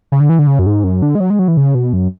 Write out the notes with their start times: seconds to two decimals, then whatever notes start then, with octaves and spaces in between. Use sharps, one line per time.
0.12 C#3
0.20 D3
0.29 E3
0.39 D3
0.47 C#3
0.59 F#2
0.67 G#2
0.84 F#2
1.02 D3
1.15 G#3
1.20 F#3
1.30 G#3
1.39 F#3
1.48 E3
1.57 C#3
1.75 B2
1.93 F#2